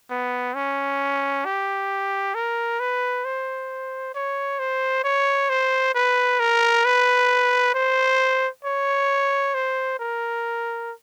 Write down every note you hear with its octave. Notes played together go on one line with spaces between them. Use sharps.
B3
C#4
G4
A#4
B4
C5
C#5
C5
C#5
C5
B4
A#4
B4
C5
C#5
C5
A#4